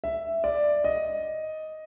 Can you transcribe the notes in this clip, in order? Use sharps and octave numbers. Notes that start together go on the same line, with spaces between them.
E5
D5
D#5